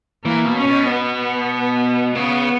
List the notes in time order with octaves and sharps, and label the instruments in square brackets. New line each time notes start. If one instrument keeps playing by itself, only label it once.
[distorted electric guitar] E3 [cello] A#3
[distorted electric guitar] B2
[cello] C#4
[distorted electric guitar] B2
[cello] B3
[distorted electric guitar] C#3 [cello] B3